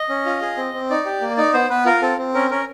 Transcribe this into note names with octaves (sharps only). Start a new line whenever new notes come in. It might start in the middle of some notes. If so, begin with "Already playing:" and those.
Already playing: D#5
C#4
F4
G#4
C4
C4
D#4 D5
G4
A#3
D#4 D5
B3 C5
B3 B4
F4 A#4
C4 A4
C4
C#4 A#4
C#4 A#4